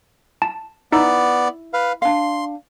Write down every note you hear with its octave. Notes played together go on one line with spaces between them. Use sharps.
A5
B3 D#4 E4 D5
B4 F5
D4 F5 C6